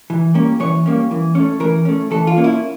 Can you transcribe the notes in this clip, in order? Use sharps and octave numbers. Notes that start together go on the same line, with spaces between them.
E3
G3 A#3 C#4
E3 C#5
G3 A#3 C#4
E3
A3 C#4
E3 A#4
A3 C#4
E3 A4
F4
A#3 C#4
E4